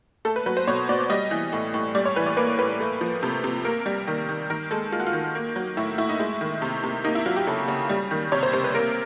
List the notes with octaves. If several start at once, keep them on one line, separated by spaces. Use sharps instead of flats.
A3 A4
B4
F#3 B4
C5
B2 C#5
B2 D5
G3 D#5
E3
A2
A2
G3 D5
C#5
E3 B4
D5
A#3 B4
A2 B4
A3
F3
C3
C3
A#3 A#4
G3
D#3
D#3
D#3 A#4
G#3 A4
G#3 F4
F#4
F4
D#3
A#3
F#3
A2 E4
A2 E4
D#4
G#3 E4
D#3
C3
C3
A#3 D#4
E4
F#3 F4
G4
C#3 A4
C#3
G3
D#3
C3 C#5
C5
C3 C5
B4
A#3 A#4